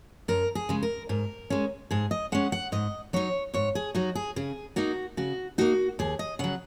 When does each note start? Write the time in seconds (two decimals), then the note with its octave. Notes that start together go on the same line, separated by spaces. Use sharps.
0.28 F#2 A#4
0.55 G#4
0.69 C#3 G#3
0.83 A#4
1.09 G#2 A#4
1.50 G#3 C#4
1.91 G#2 G#4
2.11 D#5
2.32 G#3 C#4 F#5
2.52 F#5
2.72 G#2 D#5
3.13 F#3 D#4 C#5
3.54 G#2 C#5
3.75 G#4
3.95 F#3 D#4 F#4
4.15 G#4
4.36 C#3 G#4
4.76 A#3 D#4 F#4
5.17 C#3 F#4
5.58 A#3 D#4 F#4
5.99 D#2 G#4
6.19 D#5
6.39 C#3 F#3 F#5